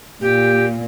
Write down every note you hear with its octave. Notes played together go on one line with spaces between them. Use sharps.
A#2 G4